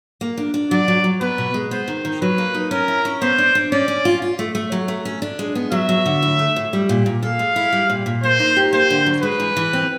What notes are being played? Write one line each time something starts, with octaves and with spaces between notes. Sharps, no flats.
A#3
D4
D4
F#3 D5
F#3
F#3
B3 B4
B2
G#3
B3 C5
D#3
D#3
F#3 B4
A#3
D#4
C#4 A#4
E4
C#4
B3 C5
D4
D4
C#4 D5
C#4
F4
F4
A3
A3
F#3
A3
C#4
D4
G#3
B3
F#3 E5
F#3
D3
A2
A3
A2
G3
A#2
A#2
A4 F5
G#3
E4
G3
A#2
A#2
A#3 C5
D#4
G4
A#3 C5
D3
F#3
G#3 B4
E3
E3
C4